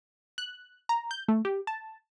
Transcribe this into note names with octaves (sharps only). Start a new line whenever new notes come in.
F#6
A#5
G6
A3
G4
A5